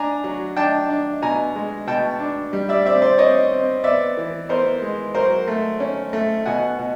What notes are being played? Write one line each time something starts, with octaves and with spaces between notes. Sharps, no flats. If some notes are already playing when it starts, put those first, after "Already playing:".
Already playing: D4 G#5 A#5
F#3
D4 G5 A5
D4
B2 G#5 A#5
G#3
B2 G5 A5
D4
G3
D5 E5
C4 D5 E5
C5 D5
C4 C#5 D#5
C4
B3 D5 E5
E3
B3 A#4 C5
G#3
F#3 A#4 C5
A3
C#4
A3
B2 F#5 G#5
B2